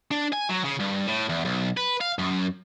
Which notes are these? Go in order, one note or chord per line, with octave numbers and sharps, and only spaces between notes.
D4
G#5
F#3
C#3
G2
A2
E2
B1
B4
F5
F#2